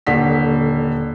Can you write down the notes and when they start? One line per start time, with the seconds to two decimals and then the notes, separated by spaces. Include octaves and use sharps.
0.07 D#1 D3 B6